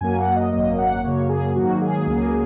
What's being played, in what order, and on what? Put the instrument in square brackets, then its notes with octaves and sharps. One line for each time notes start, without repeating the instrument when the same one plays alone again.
[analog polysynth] F#2 F#3 A#3 G#5
F#5
D#5
G#1 F#2 F#3 A#3 D#5
F#5
F#2 C#3 F#3 A#3 C#5
G#4
G#2 D#3 F#3 A#3 F#4
G#4
C#2 C#3 F#3 A#3